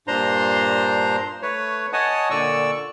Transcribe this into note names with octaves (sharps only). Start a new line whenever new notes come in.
G2 A#2 D4 C5 A#5 C6
A3 B4 C#5
C#5 D#5 F#5 G#5 A5 D#6
A#2 D3 D5 C#6 E6